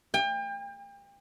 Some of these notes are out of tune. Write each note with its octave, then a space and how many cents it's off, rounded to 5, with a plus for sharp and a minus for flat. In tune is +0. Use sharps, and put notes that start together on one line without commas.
G5 +35